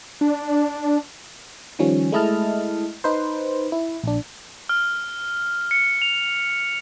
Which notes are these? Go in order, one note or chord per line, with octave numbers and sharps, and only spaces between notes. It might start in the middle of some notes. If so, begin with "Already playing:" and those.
D4
D#3 F3 G3 C#4
G#3 A3 E4 D#5 A5 F6
D#4 B4 C5
E4
A#1 D4
F6
C#7
F7